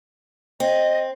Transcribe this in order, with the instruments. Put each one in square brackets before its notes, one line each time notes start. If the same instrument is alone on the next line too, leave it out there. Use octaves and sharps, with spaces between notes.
[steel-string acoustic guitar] C4 [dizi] D#5